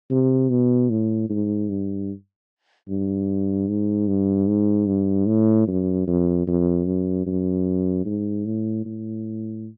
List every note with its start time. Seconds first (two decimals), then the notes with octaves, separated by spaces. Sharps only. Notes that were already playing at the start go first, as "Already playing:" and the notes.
0.10 C3
0.50 B2
0.90 A2
1.29 G#2
1.69 G2
2.88 G2
3.68 G#2
4.08 G2
4.48 G#2
4.87 G2
5.27 A2
5.67 F#2
6.07 F2
6.47 F2
6.86 F#2
7.26 F#2
8.06 G#2
8.45 A2
8.85 A2